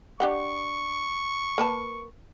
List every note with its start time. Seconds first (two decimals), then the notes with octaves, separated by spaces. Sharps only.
0.20 D4 G4 F#5 C#6
1.58 A#3 B4 A5